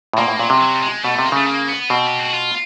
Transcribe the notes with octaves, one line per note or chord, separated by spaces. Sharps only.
A2
A#2 A#3
A2
A#2 F#3
C3
F#3
G3
G#3
B2 A3
C3
A#3
C#3 A3
A#3
B3
B2 C4
G4
F#4
F4